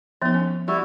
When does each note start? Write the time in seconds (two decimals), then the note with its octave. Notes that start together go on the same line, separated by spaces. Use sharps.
0.22 F3 B3 D#4 E5
0.34 C#4
0.68 G3 E4 F#4